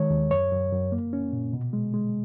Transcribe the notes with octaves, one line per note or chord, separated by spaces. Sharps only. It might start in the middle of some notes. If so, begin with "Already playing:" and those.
Already playing: D#3 G#3 C#5
D#2
F#2 C#5
F#2
F#2
A#3
C#4
A#2
B2
G#3
G#3